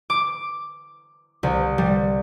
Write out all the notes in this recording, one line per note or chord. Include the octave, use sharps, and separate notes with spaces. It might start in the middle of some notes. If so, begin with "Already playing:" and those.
D6
C2
G3